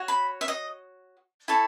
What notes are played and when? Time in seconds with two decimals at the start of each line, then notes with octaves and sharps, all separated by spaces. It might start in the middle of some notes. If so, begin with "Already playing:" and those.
Already playing: F#4 C#5
0.08 B5
0.41 E5
0.48 D#5
1.48 E4 A4 C#5